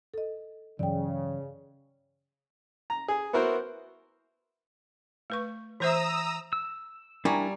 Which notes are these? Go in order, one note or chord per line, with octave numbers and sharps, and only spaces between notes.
A4 D#5
G2 C#3 E3 F#3 D5 G5
A#5
G#4
B3 E4 F#4 A#4 C5
A3 B4 C#6
E3 C5 E5 A#5 D#6 E6
E6
G3 D4 E4 A#4 G#5 A#5 C#6